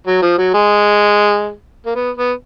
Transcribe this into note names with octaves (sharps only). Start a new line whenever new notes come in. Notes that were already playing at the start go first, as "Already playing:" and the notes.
F#3
F3
F#3
G#3
A#3
B3
B3